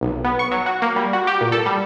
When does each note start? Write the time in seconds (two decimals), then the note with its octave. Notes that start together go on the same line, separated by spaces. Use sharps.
0.01 B1
0.24 B3
0.39 C#6
0.51 F#3
0.66 F#4
0.82 A#3
0.96 G3
1.13 F#4
1.27 G4
1.41 A#2
1.52 A4
1.66 G3